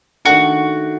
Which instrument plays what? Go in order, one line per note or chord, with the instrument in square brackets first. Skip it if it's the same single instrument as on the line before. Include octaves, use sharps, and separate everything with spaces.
[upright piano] D#3 A3 D4 [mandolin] F#4